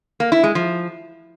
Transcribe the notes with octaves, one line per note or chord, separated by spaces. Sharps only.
A#3
E4
G#3
F3